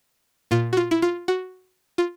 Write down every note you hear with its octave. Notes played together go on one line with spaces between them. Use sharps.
A#2 F4
F#4
F4
E4
F4
F#4
F4